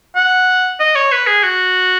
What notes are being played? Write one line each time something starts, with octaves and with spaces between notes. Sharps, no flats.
F#5
D#5
C#5
B4
G#4
F#4